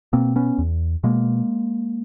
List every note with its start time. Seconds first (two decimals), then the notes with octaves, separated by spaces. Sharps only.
0.13 B2 A#3 C4
0.36 B3 C#4
0.58 E2
1.03 B2 G#3 A#3